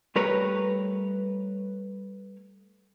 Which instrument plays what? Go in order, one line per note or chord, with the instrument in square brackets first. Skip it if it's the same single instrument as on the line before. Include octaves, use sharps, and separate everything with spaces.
[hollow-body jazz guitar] G3 A3 A#4 B4 C#5 A#5